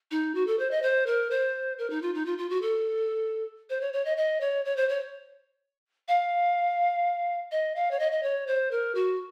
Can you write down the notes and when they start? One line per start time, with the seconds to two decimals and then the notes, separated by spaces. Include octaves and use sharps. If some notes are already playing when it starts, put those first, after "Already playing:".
0.11 D#4
0.35 F#4
0.47 A4
0.59 C5
0.71 D#5
0.82 C5
1.06 A#4
1.30 C5
1.78 A#4
1.90 D#4
2.02 F4
2.14 D#4
2.26 F4
2.38 F4
2.50 F#4
2.62 A4
3.69 C5
3.81 C#5
3.93 C#5
4.05 D#5
4.17 D#5
4.41 C#5
4.65 C#5
4.76 C5
4.89 C#5
6.08 F5
7.51 D#5
7.75 F5
7.91 C#5
7.99 D#5
8.12 D#5
8.23 C#5
8.47 C5
8.71 A#4
8.95 F#4